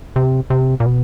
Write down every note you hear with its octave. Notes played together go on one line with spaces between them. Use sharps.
C3
C3
A#2
B2